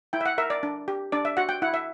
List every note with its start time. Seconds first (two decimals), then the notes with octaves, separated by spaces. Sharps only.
0.13 E4 G5
0.21 E5
0.26 F#5
0.38 A#4 E5
0.50 D5
0.63 D4
0.88 G4
1.12 D4 D5
1.25 E5
1.37 F#4 F#5
1.49 G5
1.62 E4 F#5
1.74 E5